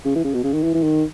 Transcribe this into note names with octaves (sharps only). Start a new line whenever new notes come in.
C#3
E3
C#3
B2
C#3
D#3
E3
E3
D#3